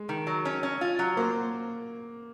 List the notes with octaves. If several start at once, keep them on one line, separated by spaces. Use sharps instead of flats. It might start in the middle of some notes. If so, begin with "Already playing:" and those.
Already playing: G#3
D#3
F#3
C#4
C#4
F4
F#3
A#3 C5